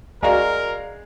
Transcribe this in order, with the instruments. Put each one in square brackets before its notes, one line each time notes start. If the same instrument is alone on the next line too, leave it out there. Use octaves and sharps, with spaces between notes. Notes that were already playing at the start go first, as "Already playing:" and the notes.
[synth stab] C#2 F#4 [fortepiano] G#3 [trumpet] A#4 [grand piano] D5 F5 A#5